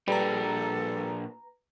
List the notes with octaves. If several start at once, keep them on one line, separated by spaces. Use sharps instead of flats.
A#2 G3 D4 A4 B4 A#5